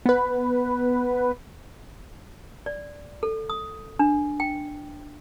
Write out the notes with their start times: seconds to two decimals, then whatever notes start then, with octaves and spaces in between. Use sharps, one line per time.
0.06 B3 B4
2.66 D5
3.23 A4
3.50 D#6
3.99 D4
4.40 G5